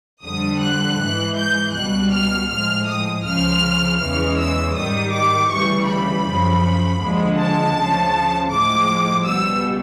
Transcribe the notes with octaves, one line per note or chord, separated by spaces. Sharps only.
F2 D3 G3 D#6
F#6
G#2 E3 G#3
G6
C#2 B2 G3 F#6
F6
A2 F3 G#3 F6
D#6
C#2 C#3 F3 F6
E2 C#3 E3 G#3 F6
E6
G#2 D#3 G3 D#6
D6
D2 C#3 E3 G3 C#6
B5
F#2 C#3 F3
D#2 D3 F3 G#3
A5
D2 C#3 F3
A2 F3 G#3 D6
C#2 B2 G3 E6